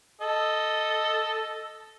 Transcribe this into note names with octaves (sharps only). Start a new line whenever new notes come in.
A4 D#5